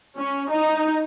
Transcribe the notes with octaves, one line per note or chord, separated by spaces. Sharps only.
C#4
D#4